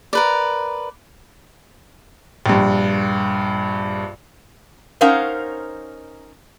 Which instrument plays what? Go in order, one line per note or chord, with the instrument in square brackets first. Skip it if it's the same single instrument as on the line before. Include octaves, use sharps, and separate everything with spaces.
[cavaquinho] A#4 B4 D5
[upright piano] A#1 G2
[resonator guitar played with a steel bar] C#4 D#4 A#4 C5 F5 F#5